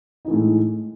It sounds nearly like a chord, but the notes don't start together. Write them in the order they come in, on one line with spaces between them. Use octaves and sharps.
D#4 E3 A3 A2 G#3